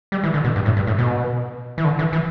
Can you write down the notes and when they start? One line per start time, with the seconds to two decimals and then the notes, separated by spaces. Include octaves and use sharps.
0.12 G3
0.24 E3
0.34 D3
0.44 B2
0.56 G2
0.66 A2
0.77 G2
0.87 A2
0.98 B2
1.78 E3
1.84 D3
1.99 E3
2.13 E3